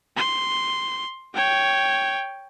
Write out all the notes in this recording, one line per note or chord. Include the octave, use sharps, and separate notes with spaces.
C6
C#5 G5